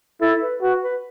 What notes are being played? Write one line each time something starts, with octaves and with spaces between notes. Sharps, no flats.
E4 A4
B4
F#4 B4
B4